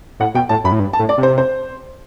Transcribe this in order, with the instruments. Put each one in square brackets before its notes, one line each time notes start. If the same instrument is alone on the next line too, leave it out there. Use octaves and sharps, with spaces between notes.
[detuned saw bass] A2 [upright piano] F#5
[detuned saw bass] B2 [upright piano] G5
[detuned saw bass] A2 [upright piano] A5
[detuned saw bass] F#2 [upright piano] B5
[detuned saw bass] A2
G2
[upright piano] A5
[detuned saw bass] A2
[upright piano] D5
[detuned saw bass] C3
[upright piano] C5
C5